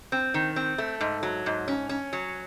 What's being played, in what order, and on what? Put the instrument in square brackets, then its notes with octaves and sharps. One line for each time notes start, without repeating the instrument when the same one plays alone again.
[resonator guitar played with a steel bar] C4
D#3
C4
A3
G#2
F#3
G#2
C#4
C#4
F#3